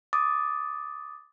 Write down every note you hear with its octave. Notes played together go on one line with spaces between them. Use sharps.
D6 D#6 A6